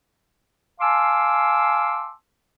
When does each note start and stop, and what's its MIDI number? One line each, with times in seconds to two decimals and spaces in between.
0.81 2.11 77
0.81 2.11 80
0.81 2.11 81
0.81 2.11 84
0.81 2.11 86
0.81 2.11 88